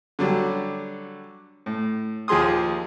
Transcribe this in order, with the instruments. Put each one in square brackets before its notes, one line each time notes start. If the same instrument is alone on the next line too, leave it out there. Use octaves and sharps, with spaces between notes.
[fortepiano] D3 F#3 G3
A2
D#2 F3 G#4 C6 D#6